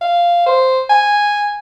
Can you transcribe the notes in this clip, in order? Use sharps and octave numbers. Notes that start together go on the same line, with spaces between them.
F5
C5
G#5